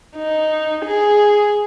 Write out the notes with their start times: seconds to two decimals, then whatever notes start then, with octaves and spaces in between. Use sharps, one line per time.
0.17 D#4
0.86 G#4